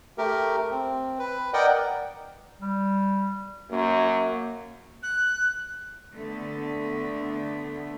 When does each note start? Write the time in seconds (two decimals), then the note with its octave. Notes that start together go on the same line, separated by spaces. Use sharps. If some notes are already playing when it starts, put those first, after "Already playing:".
0.18 A3 G4 A#4
0.71 C4
1.19 B4
1.54 A#4 D5 D#5 F#5 G5
2.61 G3
3.71 F#2 A#3
5.02 F#6
6.15 D3 A3 B3